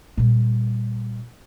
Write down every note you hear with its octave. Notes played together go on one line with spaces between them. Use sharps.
A#2 G3